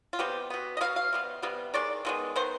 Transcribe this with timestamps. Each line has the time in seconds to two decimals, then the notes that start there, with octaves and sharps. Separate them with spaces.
0.13 F4
0.19 C3 G3 B3 G4
0.50 B2 B3
0.77 D#5
0.81 B3 F5
0.85 B2
0.96 F5
1.13 C3 G3 B3
1.42 C3 G3 B3
1.74 D#3 G#3 D5
2.05 D#3 G#3 B3
2.36 D#3 B3 C5